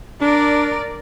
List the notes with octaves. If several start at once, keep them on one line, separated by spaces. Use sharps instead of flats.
D4 A#4 D5